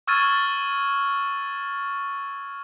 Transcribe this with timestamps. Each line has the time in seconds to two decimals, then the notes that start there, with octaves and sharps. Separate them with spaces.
0.07 C#6 E6 F6 G#6 A6 D#7